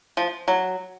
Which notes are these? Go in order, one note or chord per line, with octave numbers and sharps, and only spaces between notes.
F3
F#3